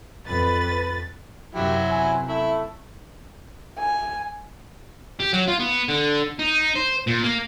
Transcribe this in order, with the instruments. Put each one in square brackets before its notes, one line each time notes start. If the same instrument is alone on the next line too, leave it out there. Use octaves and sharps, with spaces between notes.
[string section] F2 B4 A6
[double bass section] F#2 C3 [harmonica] F#3 E4 [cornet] G4
[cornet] G#5
[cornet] A3 [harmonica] E4
[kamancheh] G#5
[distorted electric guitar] G4
F#3
F4
B3
D3
D#4
C5
A#2
A#3